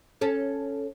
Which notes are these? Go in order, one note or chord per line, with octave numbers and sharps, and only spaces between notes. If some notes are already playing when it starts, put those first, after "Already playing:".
C#4 A4